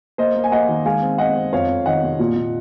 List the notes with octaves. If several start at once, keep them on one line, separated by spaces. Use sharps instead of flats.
A#3 C5 D#5
A#3
G#5
A#3 D#5 F#5
D#3
G#3 F5 G#5
C4
C4 D#5 F#5
C4
F2 C#5 F5
F2
D#3 D#5 F#5
C3
A#2
A#2